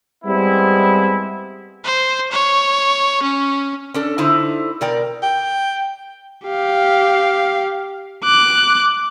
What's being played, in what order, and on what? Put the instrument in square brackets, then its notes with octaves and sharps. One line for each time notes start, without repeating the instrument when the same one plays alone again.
[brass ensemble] G3 G#3 B3 C4 E4
[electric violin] C5
C#5
C#4
[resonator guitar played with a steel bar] C#4 D4 A4
D3 D#4 E4 C5
B2 A#4 D5 G5
[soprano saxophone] G5
[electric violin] G4 F5
D6 F#6